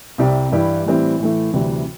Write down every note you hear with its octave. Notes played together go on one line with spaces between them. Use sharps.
C2 C3 G3
G2 E3 G3 E4 G4
A2 E3 G3 C4
A2 E3 A3
D2 C3 E3 G3